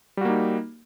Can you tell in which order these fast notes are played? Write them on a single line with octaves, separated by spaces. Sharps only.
G3 F#4 A#3 D#4